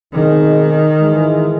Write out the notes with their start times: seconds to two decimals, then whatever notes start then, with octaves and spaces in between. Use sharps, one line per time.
0.13 B2 D#3 G#3 C4 D#4 G#4
0.99 G#2 E3 G#3